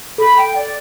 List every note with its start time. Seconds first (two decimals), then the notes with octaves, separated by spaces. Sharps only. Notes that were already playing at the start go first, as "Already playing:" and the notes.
0.18 A4 B5
0.36 G5
0.55 D5